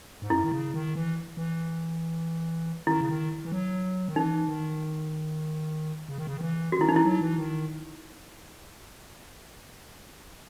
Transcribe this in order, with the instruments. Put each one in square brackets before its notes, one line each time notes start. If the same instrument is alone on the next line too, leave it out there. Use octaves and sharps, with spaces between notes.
[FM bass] G#2
[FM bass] F#2 [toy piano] E4
[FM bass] D#3
C#3
D#3
E3
E3
[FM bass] D#3 [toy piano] E4
[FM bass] C#3
D#3
E3
F#3
D#3
[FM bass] E3 [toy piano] D#4
[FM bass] D#3
C#3
D#3
C#3
D#3
E3
[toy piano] F#4
[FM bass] D#3 [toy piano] E4
[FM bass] E3 [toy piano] D#4
[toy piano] E4
[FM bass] F#3
E3
D#3